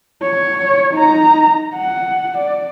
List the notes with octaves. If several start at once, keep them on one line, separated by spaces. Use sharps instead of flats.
C#5
D#4 A#5
F#5
D5